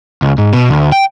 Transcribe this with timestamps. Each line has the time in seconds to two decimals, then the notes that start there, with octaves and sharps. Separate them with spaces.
0.22 C#2
0.38 G#2
0.53 B2
0.70 D2
0.92 G5